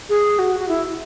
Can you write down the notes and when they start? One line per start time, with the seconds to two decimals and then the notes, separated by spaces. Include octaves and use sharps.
0.09 G#4
0.39 F#4
0.60 F#4
0.69 E4